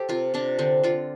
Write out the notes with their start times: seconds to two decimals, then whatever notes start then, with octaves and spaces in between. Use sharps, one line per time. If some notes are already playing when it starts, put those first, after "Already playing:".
Already playing: G4 A4 C5
0.09 C3 F4
0.34 C3 D4
0.59 D3 C4
0.84 D3 F4